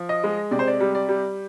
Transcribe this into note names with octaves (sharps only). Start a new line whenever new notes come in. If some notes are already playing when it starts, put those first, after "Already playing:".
Already playing: F3
D#5
G#3
C3 D5
C5
D5
G3
D5
G3